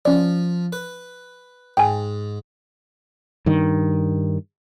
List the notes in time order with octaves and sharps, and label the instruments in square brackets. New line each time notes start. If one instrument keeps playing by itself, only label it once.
[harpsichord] F3 [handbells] C#4 D5
[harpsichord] B4
[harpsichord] G#2 [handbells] G5 G#5
[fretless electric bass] G2 D#3